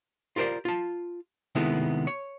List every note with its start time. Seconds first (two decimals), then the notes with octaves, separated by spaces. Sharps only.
0.36 F4 G4 A#4 C5 D5
0.65 F4 A5
1.55 C3 D#3 G#3 A3 B3 E4
2.07 C#5